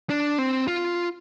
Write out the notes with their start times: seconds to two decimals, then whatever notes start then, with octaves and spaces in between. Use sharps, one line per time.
0.10 D4
0.38 C4
0.68 F4